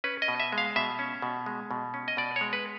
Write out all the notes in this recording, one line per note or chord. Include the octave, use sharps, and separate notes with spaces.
C#4 B4
D#5
B2
E5
G#3
F5
B2 E5
C#4
B2
G#3
B2
C#4
D#5
B2 D5
C#5
G#3
B4